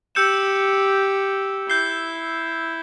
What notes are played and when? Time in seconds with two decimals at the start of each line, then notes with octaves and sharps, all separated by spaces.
0.15 G4 E6 G6 C#7 E7
1.69 E4 G6 C7 G7